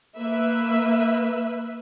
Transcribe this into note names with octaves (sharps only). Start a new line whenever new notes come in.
A#3 B4 E5